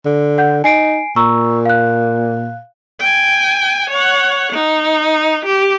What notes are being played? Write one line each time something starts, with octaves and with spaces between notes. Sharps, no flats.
D3
F#5 G6
D#4 G#5 C7 D7
A#2 A#5 C#6 E6
F5 F#6
G5 G#5
C#5 F#5
D#4
G4